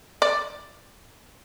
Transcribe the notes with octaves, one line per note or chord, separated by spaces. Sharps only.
D5